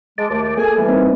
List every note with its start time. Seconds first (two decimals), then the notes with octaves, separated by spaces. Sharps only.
0.18 G#3 A5 D6
0.30 D#2 A3
0.58 A#3 G#4 A4 G#5
0.77 E3 G3
0.89 A#3 C4 D#4